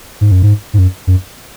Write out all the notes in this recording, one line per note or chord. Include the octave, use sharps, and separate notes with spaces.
G#2
F#2
G#2
G#2
F#2
F#2